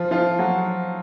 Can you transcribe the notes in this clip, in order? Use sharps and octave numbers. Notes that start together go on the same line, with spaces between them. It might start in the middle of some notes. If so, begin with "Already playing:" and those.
Already playing: F3 F4
F3 F4
F#3 F#4